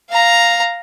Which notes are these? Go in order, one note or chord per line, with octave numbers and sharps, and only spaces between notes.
F5 A#5